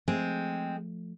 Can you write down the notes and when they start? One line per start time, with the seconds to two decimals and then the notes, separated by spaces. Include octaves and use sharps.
0.08 F3 G#3 A3 C4